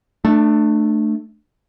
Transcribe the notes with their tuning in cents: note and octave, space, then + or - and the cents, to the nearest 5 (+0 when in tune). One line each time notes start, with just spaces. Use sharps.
A3 +0 D4 +25